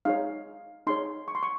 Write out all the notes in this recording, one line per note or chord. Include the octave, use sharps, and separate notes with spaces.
D#4 G#4 C#5 F5
D#4 G#4 C#5 C6
C#6
C6
C#6